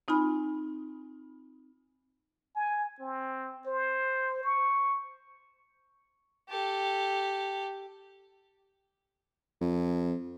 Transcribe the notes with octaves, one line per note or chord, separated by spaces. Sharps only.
C4 D#4 F4 G#5 B5
G#5
C4
C5
C#6
G4 A4
F2